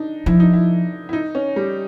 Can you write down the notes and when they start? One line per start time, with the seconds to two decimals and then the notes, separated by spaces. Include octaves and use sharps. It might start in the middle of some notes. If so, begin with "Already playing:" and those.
Already playing: D4 D#4
0.26 F3 E4
0.40 D#4
0.54 E4
1.09 E4
1.13 D#4
1.35 C#4
1.56 G3